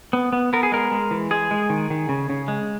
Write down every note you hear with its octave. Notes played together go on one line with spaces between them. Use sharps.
B3
B3
B3 A#4
G#4
G#3 A#4
G#3
E3
G#3 G#4
G#3
D#3
D#3
C#3
C#3
G#3